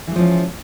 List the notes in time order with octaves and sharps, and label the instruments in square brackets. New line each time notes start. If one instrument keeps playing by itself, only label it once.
[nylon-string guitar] E3
G#3
F3
C#4